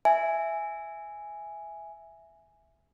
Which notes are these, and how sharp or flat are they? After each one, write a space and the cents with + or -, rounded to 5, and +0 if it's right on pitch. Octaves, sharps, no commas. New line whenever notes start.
E5 +0 G#5 +0